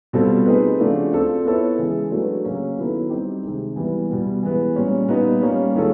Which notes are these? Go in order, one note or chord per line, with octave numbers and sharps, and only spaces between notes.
B2 G3 C4 F4 A4
A3 C4 D#4 G#4 B4
C#3 F3 A3 D4 F#4
C4 F4 A4 D5
B3 E4 A4 C#5 E5
C#3 E3 G#3
F#3 A3 D4 F#4 B4
C#3 F#3 A#3 C#4
D#3 F#3 B3 E4 A4
G3 C4 D#4 G4
C3 D#3 G#3
E3 G3 B3
B2 G3 B3
E3 G#3 B3
A#2 G3 A#3 C#4
A#2 G3 B3 D#4
G3 A#3 C#4
D#3 G#3 C#4 F4 A4